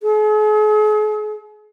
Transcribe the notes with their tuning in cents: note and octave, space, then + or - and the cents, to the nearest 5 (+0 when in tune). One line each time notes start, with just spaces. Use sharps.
G#4 +45